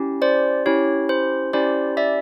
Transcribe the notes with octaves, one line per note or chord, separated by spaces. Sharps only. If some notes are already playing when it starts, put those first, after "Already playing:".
Already playing: C#4 E4 G4
C5 D5
C#4 E4 G4 C#5
C5
C#4 E4 G4 C5 D5
D5 E5